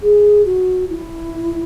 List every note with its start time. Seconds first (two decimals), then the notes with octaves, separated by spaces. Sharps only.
0.02 G#4
0.45 F#4
0.90 E4